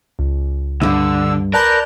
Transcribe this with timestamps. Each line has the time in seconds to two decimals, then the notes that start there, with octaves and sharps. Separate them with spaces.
0.19 C#2
0.82 C2 G2 D3 E6
1.53 A#4 B4 D5 A5 A#5 G6